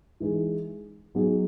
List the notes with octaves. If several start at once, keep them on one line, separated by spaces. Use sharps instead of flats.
E3 G#3 D#4 G#4
F#3 B3 D#4 G#4